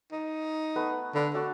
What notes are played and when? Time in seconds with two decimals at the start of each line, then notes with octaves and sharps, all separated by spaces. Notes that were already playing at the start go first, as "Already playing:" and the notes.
0.12 D#4
0.76 A3 B3 B4
1.15 D3 B4 A5 C6
1.34 A3 D4 F#4 A4